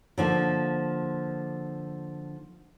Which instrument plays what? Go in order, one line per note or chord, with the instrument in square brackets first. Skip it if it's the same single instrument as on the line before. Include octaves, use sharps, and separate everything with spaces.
[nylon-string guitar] D3 F3 A#3